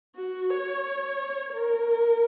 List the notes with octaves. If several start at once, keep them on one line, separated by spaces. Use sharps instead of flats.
F#4
C#5
A#4